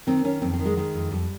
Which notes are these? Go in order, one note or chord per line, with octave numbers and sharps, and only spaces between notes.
D#3 C4
D#3 C#4
F2 C4
C4
D#3
G#3
D#3 G#3
F2
F2 G3